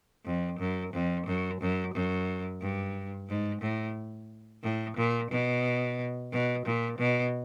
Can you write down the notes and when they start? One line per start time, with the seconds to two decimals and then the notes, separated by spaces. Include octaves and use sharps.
0.25 F2
0.59 F#2
0.93 F2
1.27 F#2
1.60 F#2
1.94 F#2
2.61 G2
3.29 G#2
3.62 A2
4.63 A2
4.97 A#2
5.31 B2
6.32 B2
6.65 A#2
6.99 B2